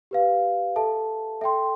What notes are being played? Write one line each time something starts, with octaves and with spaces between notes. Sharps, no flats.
G4 B4 F5
A4 E5 A5
A4 E5 G5 C6